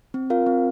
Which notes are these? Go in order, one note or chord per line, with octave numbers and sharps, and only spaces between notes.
C4
F4 A#4 F5
C4